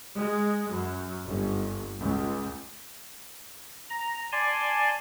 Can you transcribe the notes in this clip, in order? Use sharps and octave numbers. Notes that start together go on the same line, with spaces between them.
G#3
F#2
G1
C#2
A#5
D5 G#5 A5 C6